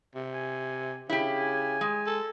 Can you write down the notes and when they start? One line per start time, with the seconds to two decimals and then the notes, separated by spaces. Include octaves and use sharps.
0.15 C3
0.34 G#5
1.09 C#3 E4 G4
1.38 G#5
1.81 G#3
2.07 A4